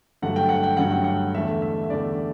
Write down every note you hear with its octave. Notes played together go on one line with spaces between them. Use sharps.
G2 D3 F#3 A3 F#5
G5
F#5
G5
G2 D3 F#3 A3 F#5
G5
F#5
E2 D3 A3 E5
E5
E5
E2 D3 A3 D5